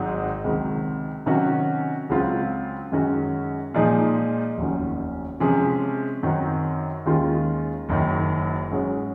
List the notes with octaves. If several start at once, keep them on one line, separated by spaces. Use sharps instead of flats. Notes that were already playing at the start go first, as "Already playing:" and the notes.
Already playing: G#1 G#2 F#3 C4 D#4
C#2 C3 D#3 F#3 C4
C3 D#3 F#3 C#4 F#4
C#2 C#3 F#3 C4 F4
F#2 D#3 G#3 C#4 F#4
A#2 F3 G#3 D#4 G#4
F1 D#2 D#3 F#3 C#4
C3 F3 G#3 C#4 G#4
F#2 D#3 F#3 C4
D#2 D#3 G#3 C#4 F4
F#1 F#2 D#3
G#2 F#3 C#4 G#4 C#5